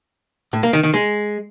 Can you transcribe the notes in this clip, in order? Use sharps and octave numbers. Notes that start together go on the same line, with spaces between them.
A2
A#3
D#3
D#3
G#3